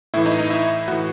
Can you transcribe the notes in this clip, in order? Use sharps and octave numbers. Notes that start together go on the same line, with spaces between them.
A2 E3 E4 E5
D#4 D#5
D#4 D#5
E4 E5
A2 E3 F#4 F#5